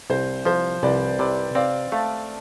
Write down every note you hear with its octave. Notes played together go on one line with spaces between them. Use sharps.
C2 C5
F3 C5
C2 B4 D5
C3 B4 D5
C4 D5 F5
A3 F5 A5